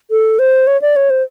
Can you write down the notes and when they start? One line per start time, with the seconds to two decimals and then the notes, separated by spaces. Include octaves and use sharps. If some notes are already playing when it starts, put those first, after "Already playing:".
0.11 A4
0.39 C5
0.67 C#5
0.82 D5
0.96 C#5
1.10 C5